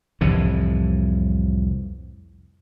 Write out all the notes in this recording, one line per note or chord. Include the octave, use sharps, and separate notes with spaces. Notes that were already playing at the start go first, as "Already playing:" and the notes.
C2 F2 A2 E3